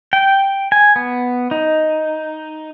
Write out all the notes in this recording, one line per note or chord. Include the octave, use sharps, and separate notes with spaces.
G5
G#5
B3
D#4